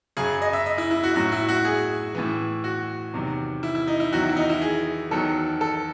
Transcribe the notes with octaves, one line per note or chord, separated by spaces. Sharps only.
F#2 C#3 F#3 G#4
D#5
E5
D#5
E4
E4
F#4
A2 F#3 F#4
E4
F#4
G#4
A2 E3
F#4
E2 C3 D#3 F#3
E4
E4
D#4
E4
E2 D#3 F#3 F#4
E4
D#4
E4
G#4
E2 D#3 F#3 A4
A4